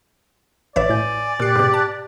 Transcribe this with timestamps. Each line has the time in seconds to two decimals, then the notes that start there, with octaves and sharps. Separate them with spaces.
0.76 A1 B4 C#5 D5 E5
0.89 A2 G#5 G6
1.40 A#2 G4 F#6 C7
1.56 G#2 B2
1.74 A5